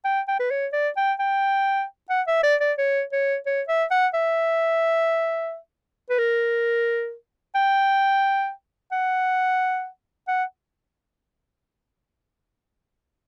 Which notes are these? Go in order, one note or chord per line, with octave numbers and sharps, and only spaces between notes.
G5
G5
B4
C#5
D5
G5
G5
F#5
E5
D5
D5
C#5
C#5
C#5
E5
F#5
E5
B4
A#4
G5
F#5
F#5